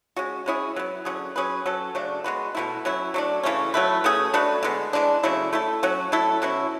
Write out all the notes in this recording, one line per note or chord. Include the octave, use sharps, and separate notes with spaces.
G#3 C#4 F#4
G#3 C#4 E4 G#4
F#3 B3 E4
D3 F#3 C#4 G#4
F#3 C#4 G#4 B4
F#3 C#4 F#4 A4
C#3 F#3 A3 D4
G#3 B3 F#4 B4
B2 F#3 A3 E4
F#3 C#4 E4
F#3 A3 D4
C#3 E3 A3 C#4
F#3 A3 E4 B4
B2 A3 C#4 G#4
A3 D4 F#4 B4
D3 G#3 B3
E3 G#3 D4
C#3 F#3 A3 E4
A3 E4 A4
F#3 C#4 F#4
F#3 A3 E4 A4
B2 F#3 C#4 E4